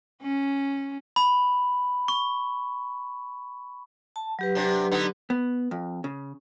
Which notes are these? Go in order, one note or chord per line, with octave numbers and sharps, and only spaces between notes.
C#4
B5
C#6
A5
F#3 G4 B4
C3 D4
D3 B3 D#4
B3
F2
C#3